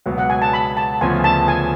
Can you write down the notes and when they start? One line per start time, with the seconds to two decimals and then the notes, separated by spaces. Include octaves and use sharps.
0.06 C#2 B2 F#3 B3
0.18 F#5
0.30 G#5
0.42 A5
0.53 B5
0.77 A5
1.01 D2 C#3 F3 B3 F4 G#5
1.24 A5
1.48 G#5